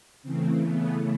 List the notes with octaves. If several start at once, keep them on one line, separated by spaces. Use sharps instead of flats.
C#3 E3 A3 C4
B3